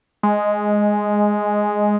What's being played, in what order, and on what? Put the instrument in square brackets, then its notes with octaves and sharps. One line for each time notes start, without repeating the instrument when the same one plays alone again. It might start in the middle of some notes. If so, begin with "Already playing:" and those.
[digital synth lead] G#3